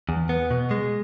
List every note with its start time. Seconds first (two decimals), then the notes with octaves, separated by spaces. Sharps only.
0.09 E2
0.29 B3
0.51 B2
0.71 G#3